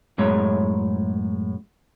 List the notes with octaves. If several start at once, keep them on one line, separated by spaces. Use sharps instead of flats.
F#2 A2 G#3 C#5